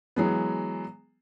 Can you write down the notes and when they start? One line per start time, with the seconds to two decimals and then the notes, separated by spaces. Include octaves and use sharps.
0.16 E3 F#3 G#3 B3